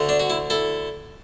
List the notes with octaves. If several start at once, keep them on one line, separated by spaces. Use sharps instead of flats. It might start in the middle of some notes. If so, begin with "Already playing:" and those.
Already playing: D2 D3 A3
D4
F#4
E4
E4 A4